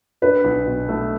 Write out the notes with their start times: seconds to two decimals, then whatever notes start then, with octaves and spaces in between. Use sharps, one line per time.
0.22 D4 B4
0.44 B1
0.67 B2
0.89 A3